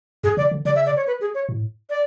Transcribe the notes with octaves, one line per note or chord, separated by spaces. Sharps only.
F#2 G#4
C#3 D5
D3
C#3 D5
E5
D5
C#5
B4
G#4
C#5
A2
D5